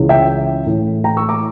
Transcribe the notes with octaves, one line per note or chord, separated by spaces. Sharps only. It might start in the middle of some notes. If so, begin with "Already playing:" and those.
Already playing: C#2 C#3 E3
E5 G5
A2 E3 A3
G5 A#5
C#6 E6
A#5 D6